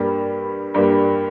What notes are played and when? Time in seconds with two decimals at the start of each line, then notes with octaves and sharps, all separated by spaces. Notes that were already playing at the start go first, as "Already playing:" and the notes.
Already playing: G2 G3 A#3
0.74 G2 G3 A#3